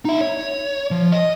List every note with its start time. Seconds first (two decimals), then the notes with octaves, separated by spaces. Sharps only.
0.05 D#4 E5
0.21 C#5
0.91 F3
1.12 D#5